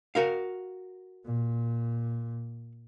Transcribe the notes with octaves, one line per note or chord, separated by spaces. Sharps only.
F#4 A#4 F5
A#2